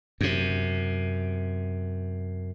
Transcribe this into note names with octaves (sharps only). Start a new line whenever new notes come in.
F#2 C3